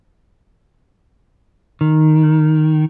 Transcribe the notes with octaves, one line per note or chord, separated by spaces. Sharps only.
D#3